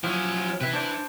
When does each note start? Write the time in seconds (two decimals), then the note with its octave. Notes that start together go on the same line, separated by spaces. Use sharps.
0.04 F3 F#3 C#4 E4
0.61 C3 E4 B4 E5
0.73 D4 C5 D5